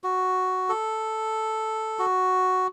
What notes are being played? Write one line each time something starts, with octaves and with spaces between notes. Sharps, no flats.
F#4
A4
F#4